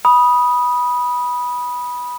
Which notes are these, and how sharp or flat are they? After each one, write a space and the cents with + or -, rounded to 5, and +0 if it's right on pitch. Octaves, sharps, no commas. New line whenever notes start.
B5 -15 D#6 +0